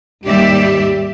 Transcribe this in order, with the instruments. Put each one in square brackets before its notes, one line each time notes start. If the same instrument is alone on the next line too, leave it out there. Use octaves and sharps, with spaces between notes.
[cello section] D#2 G#2 G3 G4 D5 E5